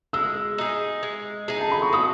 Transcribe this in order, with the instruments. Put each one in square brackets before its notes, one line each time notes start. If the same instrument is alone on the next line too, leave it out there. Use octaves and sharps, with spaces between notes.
[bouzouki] G#3 [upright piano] E6
[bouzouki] D#4 G#4
G#3
D#4 G#4
[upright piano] A5
B5
C#6
[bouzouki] F#3 [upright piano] D#6